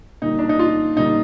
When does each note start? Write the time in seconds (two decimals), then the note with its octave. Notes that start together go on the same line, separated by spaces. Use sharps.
0.22 A#2 G3 D#4
0.39 D4
0.49 D#4
0.59 F4
0.97 A#2 G3 D#4